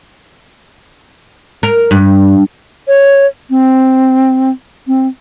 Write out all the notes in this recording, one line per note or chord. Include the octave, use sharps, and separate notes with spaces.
A#4
G2
C#5
C4
C4